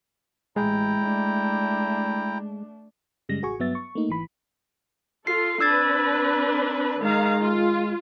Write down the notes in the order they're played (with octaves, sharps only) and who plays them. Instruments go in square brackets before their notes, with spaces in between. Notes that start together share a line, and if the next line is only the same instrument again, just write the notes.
[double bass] A1 [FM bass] G#3 [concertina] E4 G5 A#5
[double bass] A3 D4
[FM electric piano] F#2 C#3 G3 G#3 A#6
A1 F#4 G#4 G#5 C#6
G2 F#3 B3 E5 A6
C#6
A3 A#3 D#4
G#1 E3 B5
[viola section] F4 A4 [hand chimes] C7
[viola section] C4 D4 B4 [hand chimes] E6 G#6 A6
[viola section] D#3 F5 A#5 [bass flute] G#3
[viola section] F4